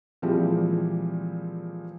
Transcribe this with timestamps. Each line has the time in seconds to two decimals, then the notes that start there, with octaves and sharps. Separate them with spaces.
0.22 A#2 E3 F3 G3 G#3 C4